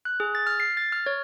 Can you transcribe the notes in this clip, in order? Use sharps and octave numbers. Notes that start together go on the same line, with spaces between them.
F#6
G#4
A6
F6
C7
A6
F6
C#5